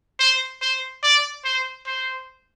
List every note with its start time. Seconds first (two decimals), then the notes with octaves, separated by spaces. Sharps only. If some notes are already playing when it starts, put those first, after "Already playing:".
0.19 C5
0.61 C5
1.03 D5
1.45 C5
1.86 C5